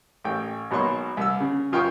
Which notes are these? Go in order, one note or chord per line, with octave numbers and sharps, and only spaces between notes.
A1 G5
G#1 B2 F#3 A#3 C6 C#6
C2 E6
C#3
F#2 F4 A#4 G5 C#6 D#6